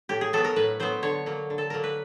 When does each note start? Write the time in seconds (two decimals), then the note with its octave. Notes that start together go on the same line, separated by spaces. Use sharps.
0.09 A2 G4
0.21 G#4
0.33 F#3 B3 A4
0.44 A#4
0.56 A2 B4
0.80 F#3 B3 C5
1.02 D3 C#5
1.26 F#3 A#3
1.50 D3
1.58 A4
1.70 F#3 A#3 A#4
1.84 B4